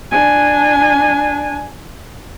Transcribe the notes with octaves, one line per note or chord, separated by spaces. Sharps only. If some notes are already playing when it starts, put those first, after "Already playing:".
D4 G#5